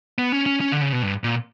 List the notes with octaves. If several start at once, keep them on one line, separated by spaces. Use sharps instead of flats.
B3
C#4
C#4
C#4
D3
C#3
B2
G2
A#2